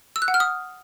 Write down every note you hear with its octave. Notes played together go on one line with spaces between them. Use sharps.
E6
F#6
F#5
F6
D#6